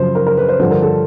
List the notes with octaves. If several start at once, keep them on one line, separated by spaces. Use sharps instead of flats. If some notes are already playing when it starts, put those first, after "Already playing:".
Already playing: F#2 C#3 F3 C5
A#4
A#4
B4
C5
G2 D3 F3 C5
A#4
A4